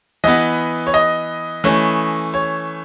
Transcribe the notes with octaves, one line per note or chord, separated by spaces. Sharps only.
E3 B3 D#5
C#5
D#5
E3 A3 C#4
C#5